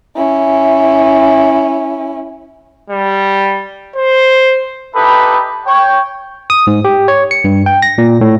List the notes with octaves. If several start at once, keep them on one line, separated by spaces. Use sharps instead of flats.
C#4 E4
G3
C5
D#4 E4 G4 A4 B4
C#5 G5
D#6
G#2
G4
C#5
C#7
G2
G5
A#6
A#2
A2